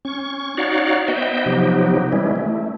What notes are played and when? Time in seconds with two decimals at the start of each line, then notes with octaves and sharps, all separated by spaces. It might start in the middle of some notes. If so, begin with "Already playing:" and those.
0.05 C#4 C#6
0.57 D#4 F#4 C#5 D5 F5 F#5
1.08 B3 C5 D#5 E5 G5
1.46 C3 F3 F#3 B3 D#4 G4
2.13 E3 G3 G#3 C#4 E4
2.36 A3